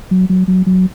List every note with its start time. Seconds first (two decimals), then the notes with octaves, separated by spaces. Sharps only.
0.11 F#3
0.29 F#3
0.48 F#3
0.66 F#3